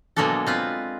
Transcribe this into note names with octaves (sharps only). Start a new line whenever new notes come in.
B2 F#3 G#3 A#3 D4 A4
C4 F4 B4